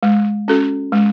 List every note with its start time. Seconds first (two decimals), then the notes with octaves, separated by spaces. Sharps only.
0.03 G#3
0.48 C#4 F#4 A4
0.92 G#3